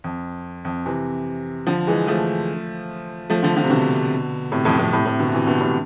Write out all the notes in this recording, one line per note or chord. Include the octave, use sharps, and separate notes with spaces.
F2
F2
C3 E3
D3 F3
E3 G#3
F3 A3
F3 A3
D3 F3
D3 F3
C3
B2 D3
A2 C3
F2 A2
F2 A2
A2 C3
A2 C3
B2 D3
C3 E3
B2 D3
A2 C3